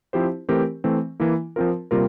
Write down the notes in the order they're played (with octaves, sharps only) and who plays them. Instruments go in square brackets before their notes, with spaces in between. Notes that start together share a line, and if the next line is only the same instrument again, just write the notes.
[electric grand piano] F3 C4 E4 G4 C5
E3 A3 C4 G4 A#4
E3 A3 C4
E3 A#3 E4
F3 C4 F4 A#4
C3 G3 A#3 F4 A#4